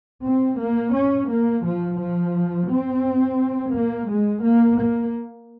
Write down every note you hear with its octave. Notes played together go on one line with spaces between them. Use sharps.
C4
A#3
C#4
A#3
F3
F3
C4
A#3
G#3
A#3
A#3